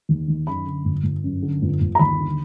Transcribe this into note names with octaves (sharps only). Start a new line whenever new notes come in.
D#2
D#3
F#2 B5
D3
G1
G1
F#2
D3
G1
G1
A#5
D#2 B5
D3